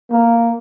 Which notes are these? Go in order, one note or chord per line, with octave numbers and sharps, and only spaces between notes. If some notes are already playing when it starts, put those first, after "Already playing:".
A#3